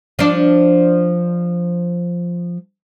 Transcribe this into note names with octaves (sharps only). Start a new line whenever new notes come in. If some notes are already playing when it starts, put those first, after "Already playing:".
F3 D4